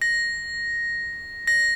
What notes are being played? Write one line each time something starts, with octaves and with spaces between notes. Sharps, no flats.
A#6
A#6